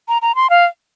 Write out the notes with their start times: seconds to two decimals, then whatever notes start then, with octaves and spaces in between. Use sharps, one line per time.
0.08 A#5
0.22 A#5
0.35 C6
0.50 F5